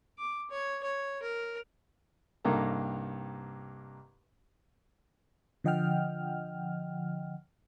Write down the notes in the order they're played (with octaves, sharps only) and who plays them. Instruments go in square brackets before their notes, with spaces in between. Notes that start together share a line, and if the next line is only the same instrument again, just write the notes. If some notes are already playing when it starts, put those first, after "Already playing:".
[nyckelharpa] D6
C#5
C#5
A#4
[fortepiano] C2 G2 A#3 D#4 A4 A#5
[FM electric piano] D3 F3 D#5 F#5 G5 F6